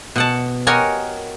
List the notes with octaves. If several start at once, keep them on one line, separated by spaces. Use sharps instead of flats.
B2 F#5 A5
F#4 G4 A#4 C#5 D#5 G#5